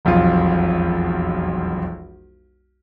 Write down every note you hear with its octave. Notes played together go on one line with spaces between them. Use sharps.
E1 B1 F2 F4